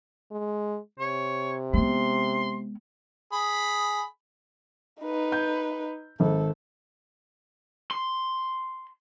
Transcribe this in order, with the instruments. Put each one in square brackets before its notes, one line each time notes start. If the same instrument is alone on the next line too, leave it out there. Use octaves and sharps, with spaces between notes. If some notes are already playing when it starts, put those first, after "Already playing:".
[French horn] G#3
[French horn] C3 [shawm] C#5
[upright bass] G#3 B3 [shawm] C6
[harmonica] G#4 B5
[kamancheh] D#4 B4
[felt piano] G6
[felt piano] G#1 [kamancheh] A4
[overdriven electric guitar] C6